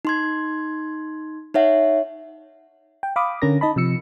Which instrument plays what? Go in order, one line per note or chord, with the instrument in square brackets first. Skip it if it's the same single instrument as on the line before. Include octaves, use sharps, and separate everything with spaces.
[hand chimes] D#4 C6 G#6
D#4 C#5 E5 F#5
[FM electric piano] G5
F5 B5 D6 D#6
D3 C#4 A#4 A#6
D#4 D#5 A5 B5
C3 F3 E6 C#7